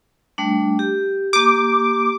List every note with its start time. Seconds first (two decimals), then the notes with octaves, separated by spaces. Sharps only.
0.38 G3 A3 D4
0.79 G4
1.33 A#3 G4 D6